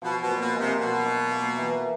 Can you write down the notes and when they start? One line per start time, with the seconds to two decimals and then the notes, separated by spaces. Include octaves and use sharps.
0.02 B2 F3
0.22 B2
0.28 A#2
0.41 B2
0.54 G#3
0.60 C3
0.79 B2 F#3
1.06 D#4
1.31 A#3
1.57 E3